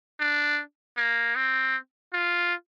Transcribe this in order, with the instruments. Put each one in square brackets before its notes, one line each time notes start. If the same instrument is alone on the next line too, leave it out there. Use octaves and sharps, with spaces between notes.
[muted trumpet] D4
A#3
C4
F4